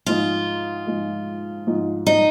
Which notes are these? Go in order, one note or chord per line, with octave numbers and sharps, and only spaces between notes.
G#2 F3 G#3 F4
G#2 F3 G#3
G#2 F3 G#3
D#4